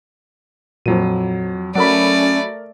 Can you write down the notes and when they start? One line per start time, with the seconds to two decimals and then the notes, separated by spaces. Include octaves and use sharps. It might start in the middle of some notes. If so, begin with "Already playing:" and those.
0.86 F2 A#2 F3 F#3 D#7
1.75 F#3 A3 C#4 A4 A#4 D5 B5 D7